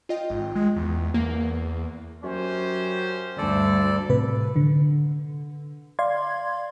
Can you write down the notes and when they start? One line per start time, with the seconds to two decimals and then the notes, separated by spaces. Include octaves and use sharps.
0.09 F4 D#5 G5
0.30 G#1
0.56 G#3
0.76 E2
1.14 E2 A#3
2.24 F#2 C#4 G4 C5
3.38 D2 G2 A4 D5
4.10 A2 C3 B4
4.56 D3
5.99 D5 F5 C6 G#6